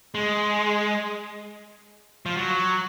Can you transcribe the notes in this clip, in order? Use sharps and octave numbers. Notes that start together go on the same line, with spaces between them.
G#3
F3
F#3